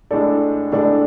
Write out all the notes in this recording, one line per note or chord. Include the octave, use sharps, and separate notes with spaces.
A2 G#3 D4 A4 D5
A2 G#3 D4 A4 D5